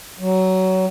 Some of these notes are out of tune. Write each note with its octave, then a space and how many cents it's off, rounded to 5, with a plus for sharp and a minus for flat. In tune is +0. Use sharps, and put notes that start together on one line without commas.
F#3 +20